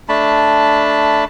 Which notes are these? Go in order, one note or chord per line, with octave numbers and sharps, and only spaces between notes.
A3 D4 A5 B5